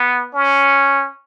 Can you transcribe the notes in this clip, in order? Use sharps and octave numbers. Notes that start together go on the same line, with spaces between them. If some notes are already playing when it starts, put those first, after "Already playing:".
Already playing: B3
C#4